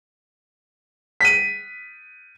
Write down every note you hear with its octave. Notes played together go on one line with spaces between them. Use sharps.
B6 D#7